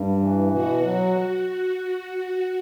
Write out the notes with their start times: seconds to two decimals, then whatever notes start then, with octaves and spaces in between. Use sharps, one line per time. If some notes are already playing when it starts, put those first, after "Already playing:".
Already playing: G2
0.21 E3
0.53 B2 F#4
0.84 F#3